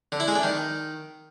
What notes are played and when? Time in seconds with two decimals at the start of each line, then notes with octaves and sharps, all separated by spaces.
0.12 D3
0.20 E4
0.28 G#3
0.36 D4
0.43 D#3